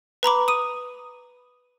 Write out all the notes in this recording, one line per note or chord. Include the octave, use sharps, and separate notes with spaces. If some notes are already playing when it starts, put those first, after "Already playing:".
B4 A#5 B5 D6
D#6 D#7